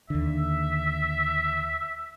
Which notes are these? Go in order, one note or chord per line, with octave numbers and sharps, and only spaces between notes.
D#2 D3 E5